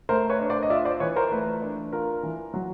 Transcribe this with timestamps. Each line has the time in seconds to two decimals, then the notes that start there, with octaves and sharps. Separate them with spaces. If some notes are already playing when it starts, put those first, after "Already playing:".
0.09 A3 A#4 C5
0.29 B4 C#5
0.40 D4
0.50 C5 D5
0.63 D#5
0.70 F4 D5 E5
0.85 C5 D5
1.00 E3 B4 C#5
1.16 A#4 C5
1.31 A3 B4
1.62 D4
1.93 F4 A#4
2.23 E3
2.54 F#3